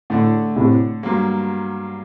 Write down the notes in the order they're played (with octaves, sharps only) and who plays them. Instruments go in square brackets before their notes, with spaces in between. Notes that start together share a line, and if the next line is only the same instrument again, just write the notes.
[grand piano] A2 [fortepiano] D3 A3 D4
[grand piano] A2 C3
[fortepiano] G2 F#3 A#3